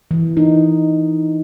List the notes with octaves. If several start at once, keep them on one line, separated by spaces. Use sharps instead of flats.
E3
D#4